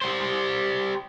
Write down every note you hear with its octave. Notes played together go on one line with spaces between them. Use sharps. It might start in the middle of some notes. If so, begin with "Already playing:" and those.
G3 C5